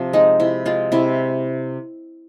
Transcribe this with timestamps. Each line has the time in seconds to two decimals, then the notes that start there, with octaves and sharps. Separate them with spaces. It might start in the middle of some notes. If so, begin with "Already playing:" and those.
Already playing: C3 F3
0.13 G#3 D#4
0.40 C3 E4
0.66 G#3 F4
0.92 C3 E4